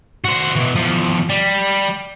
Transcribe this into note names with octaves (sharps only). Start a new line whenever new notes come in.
F#4 C5
B2 E3
E2 F3
G3